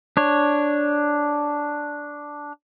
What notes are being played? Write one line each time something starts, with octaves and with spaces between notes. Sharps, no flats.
D4 C#5